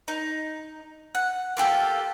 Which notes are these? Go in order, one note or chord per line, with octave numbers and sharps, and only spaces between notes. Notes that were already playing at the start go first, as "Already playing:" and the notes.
D#4
F#5
A#3 F4 G4 A4